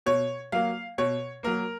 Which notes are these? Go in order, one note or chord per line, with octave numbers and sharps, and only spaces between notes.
B2 C#5
F#3 A#3 F5
B2 C#5
F#3 A#3 A#4